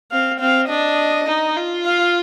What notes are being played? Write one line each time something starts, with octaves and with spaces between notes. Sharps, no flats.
C4 F5
C4 F5
D4 D#5
D#4
F4
F5